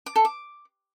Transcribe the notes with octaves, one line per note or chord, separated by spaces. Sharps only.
D6
A4
D6